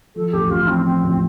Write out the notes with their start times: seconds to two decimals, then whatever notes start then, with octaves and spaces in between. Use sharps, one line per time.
0.15 F3 A4
0.33 A1 G4
0.50 A1 F4
0.68 F3 C4
0.85 F3 C4
1.03 A1